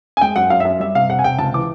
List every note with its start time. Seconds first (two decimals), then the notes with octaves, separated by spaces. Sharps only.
0.17 G#5
0.21 G#3 G5
0.36 F#2 F#5
0.50 F#2 F5
0.60 E5
0.65 F#2
0.80 G3 E5
0.95 C3 F5
1.09 C3 F#5
1.19 G#5
1.24 C3 G5
1.39 C#2 A5
1.54 E3 D6